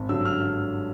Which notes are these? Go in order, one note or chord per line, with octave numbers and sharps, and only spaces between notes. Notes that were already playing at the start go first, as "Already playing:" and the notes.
Already playing: G#1
G2 D3 F#3 E6
F6